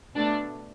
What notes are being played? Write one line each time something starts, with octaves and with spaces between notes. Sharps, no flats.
B2 A3 D4